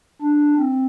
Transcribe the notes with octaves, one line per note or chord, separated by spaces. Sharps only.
D4
C4